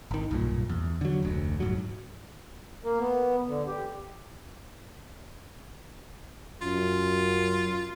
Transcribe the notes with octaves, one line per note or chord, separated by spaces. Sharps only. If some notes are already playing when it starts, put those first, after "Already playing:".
G#1 D#3
B1 G2 A#2
E2
D3 F#3
F1 D2
D#1 G#2 F#3
A#3
B3
D3
G4
F#2 F4